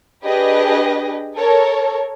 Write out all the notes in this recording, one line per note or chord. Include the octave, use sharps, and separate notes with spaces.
D4 G4 G#4 B4 D#5
A4 A#4 C#5